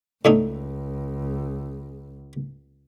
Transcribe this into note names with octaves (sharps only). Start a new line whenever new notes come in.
C#2 A2 D4 D#4